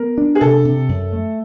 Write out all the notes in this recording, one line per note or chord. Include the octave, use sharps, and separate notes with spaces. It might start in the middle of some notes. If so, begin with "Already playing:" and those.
Already playing: B3 A#4
D4
G#4
C3 A4
C3
F#2
A3